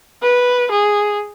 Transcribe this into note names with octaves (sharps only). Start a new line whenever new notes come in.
B4
G#4